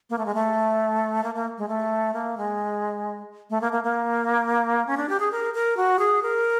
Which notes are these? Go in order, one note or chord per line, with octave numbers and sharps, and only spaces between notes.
A#3
A3
G#3
A3
A#3
A#3
G#3
A3
A#3
G#3
A3
A#3
A#3
A#3
C#4
D4
G4
G#4
A#4
A#4
F#4
G#4
A#4